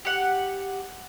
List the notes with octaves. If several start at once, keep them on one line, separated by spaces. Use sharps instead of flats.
G4 F#5